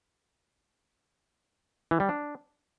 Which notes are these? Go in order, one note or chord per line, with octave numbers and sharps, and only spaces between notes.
E3
G3
D4